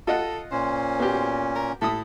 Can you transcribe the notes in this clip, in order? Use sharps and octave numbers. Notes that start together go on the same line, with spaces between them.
F4 A4 D#5 F#5
A#2 C#4 C5
B3 F#4 G4
A#4
A2 E4 A4 D#6